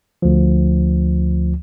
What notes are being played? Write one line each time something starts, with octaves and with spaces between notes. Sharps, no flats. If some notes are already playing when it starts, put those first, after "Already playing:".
D2 F3